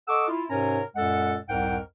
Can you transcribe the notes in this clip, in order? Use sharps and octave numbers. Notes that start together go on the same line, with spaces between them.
A4 D#5 F#5 C#6 D6 E6
E4 F4
G#2 C3 C#4 A#4 C#5 A#5
F#2 A#2 G#3 A4 F#5
C2 F2 G#2 A#4 F#5 G5